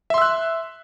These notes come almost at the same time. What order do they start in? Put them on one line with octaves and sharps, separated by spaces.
E5 C6 E6 F#6